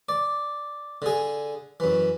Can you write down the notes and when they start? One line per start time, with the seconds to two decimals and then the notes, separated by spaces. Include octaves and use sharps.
0.09 D5
1.02 D3 G#4
1.80 F#2 E3